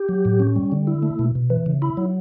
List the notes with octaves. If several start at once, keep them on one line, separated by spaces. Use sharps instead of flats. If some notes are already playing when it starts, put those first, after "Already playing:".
Already playing: G4
F#3
A2
C#4
G3
D3
E4
A3
B2
B2
E3
C#3
E4
F#3